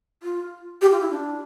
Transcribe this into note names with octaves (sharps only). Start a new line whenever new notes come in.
F4
G4
F4
E4
D4